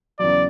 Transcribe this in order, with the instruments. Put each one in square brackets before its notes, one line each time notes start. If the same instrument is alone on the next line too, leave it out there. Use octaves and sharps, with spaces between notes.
[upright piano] E2 C#3 F#3 [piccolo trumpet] D5